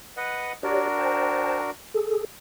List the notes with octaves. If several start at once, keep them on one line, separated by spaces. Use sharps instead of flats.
B4 D#5 F#5
D4 F#4 G4 A#4 C#5 D5
C5 G5 A5
G#4 A4